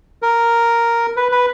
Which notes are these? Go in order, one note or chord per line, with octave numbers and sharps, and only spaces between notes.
A#4
B4
B4